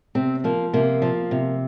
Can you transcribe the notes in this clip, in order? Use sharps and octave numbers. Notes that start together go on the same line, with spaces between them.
C3 C4
F3 A#3
C3 A#3
F3
C3